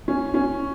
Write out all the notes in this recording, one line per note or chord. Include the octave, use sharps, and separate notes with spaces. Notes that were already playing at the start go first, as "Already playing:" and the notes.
C#4
C#4